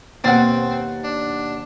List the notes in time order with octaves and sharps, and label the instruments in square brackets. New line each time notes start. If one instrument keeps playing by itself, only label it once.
[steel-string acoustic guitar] D#2 B2 [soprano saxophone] C4 [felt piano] F#5 A6
[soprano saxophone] D4